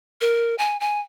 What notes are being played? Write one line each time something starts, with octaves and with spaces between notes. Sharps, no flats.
A#4
G#5
G#5